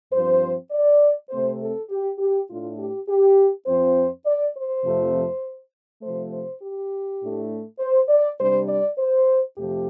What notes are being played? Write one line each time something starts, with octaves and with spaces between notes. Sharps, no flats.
G2 F3 C4 C5
D5
C3 A3 C4 C5
A4
G4
G4
A2 A3 D4 F4
G4
G4
F2 F3 C4 C5
D5
C5
F2 C3 F3 A3
C3 F3 A3 C5
C5
G4
A2 A3 D4
C5
D5
C3 G3 D4 C5
D5
C5
F2 C3 F3 A3 G4